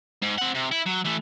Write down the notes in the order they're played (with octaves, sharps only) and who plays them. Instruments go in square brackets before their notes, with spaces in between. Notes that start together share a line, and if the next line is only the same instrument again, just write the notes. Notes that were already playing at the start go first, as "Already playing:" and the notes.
[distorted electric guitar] G#2
C4 F#5
C3
E4
F#3
E3 A3